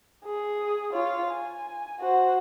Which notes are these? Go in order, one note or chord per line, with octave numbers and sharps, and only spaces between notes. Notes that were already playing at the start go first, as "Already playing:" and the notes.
G#4
F4 C#5
G#5
F#4 C5